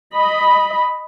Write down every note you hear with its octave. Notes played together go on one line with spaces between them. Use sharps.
D#5 B5